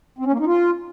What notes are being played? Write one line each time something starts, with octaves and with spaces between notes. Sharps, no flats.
C4
C#4
A#3
D#4
F4